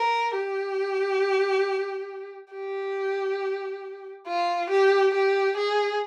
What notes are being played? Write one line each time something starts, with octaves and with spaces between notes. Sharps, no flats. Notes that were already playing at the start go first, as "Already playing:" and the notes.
Already playing: A#4
G4
G4
F4
G4
G4
G#4